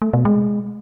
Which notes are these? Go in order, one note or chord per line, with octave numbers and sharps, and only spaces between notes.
A3
B2
G#3